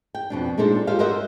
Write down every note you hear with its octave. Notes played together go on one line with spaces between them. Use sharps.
G5
F2 B2 D4
A#2 G#3 D4 D#4 A4 C5
F4 G4 C5 E5 F5
F#4 A#4 C5 D#5 E5